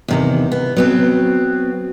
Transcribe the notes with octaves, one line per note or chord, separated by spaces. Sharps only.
E2 C3 D#3
B3
F#3 B3 C4